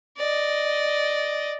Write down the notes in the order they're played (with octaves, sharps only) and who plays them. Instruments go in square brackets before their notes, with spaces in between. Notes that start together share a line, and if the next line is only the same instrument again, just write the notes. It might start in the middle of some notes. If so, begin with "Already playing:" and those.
[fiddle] D5 D#5